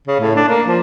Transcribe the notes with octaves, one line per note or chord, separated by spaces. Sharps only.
C#3
A2
D4
A#3
F3